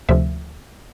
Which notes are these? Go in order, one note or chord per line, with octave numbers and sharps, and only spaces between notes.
D2 C3 F3 E5